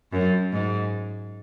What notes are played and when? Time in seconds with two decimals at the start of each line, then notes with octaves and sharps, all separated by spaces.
0.12 F#2
0.53 G#2